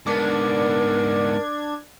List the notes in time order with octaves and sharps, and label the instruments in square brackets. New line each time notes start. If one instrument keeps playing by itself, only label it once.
[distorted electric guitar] G#2 B3 [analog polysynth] D4 G#6 [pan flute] A#4